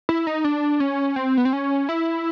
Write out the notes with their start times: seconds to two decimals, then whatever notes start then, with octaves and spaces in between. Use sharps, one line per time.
0.09 E4
0.27 D#4
0.44 D4
0.80 C#4
1.16 C4
1.37 B3
1.45 C4
1.53 C#4
1.89 E4